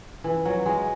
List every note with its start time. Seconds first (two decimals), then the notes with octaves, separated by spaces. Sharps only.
0.24 E3
0.45 F#3
0.66 G#3